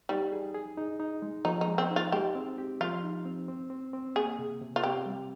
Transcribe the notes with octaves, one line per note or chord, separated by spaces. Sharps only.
G3 D#4
G#4
G#4
D#4
D#4
G#3
F3 D#4
D#4
G#3
C4
D#4
F4
G#3 G4
C4
G4
F3 F4
D#4
C4
C4
C4
C4
A#3 G#4
C3
C3
F4
C4 G4
G3